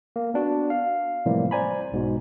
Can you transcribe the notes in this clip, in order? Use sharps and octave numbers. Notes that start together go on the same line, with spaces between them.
A#3
B3 D4 F#4
F5
A2 C3 E3 F3 G3 A#3
C5 D5 G#5 A#5 B5
B1 G#2 B2